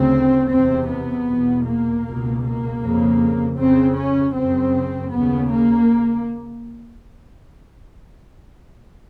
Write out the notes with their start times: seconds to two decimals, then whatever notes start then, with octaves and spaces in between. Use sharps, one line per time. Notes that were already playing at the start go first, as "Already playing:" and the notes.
Already playing: D2 C#3 C4
0.50 E2 C3 C4
0.88 B3
1.27 E2 B2
1.65 A#3
2.04 C#2 B2
2.43 A#3
2.81 F2 C#3
3.58 F2 C#3 C4
3.96 C#4
4.35 F#2 C#3 C4
5.12 D#2 C#3 B3
5.51 A#3